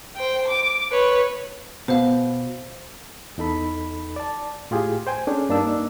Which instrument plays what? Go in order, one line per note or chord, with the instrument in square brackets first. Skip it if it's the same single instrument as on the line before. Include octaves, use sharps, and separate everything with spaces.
[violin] C5 G5
D6
B4 C#5
[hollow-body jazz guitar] B2 [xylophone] C5 F5
[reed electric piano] E2 D#4 A4 B5
D5 A5
A2 F4 G4 G#4
C5 G5 G#5
C#4 D4 G#4 A4
G2 A#3 D4 D#4 E6